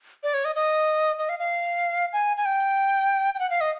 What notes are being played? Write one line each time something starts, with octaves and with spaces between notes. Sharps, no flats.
D5
C#5
D#5
D#5
D#5
F5
F5
G#5
G#5
G5
G5
F#5
F5
D#5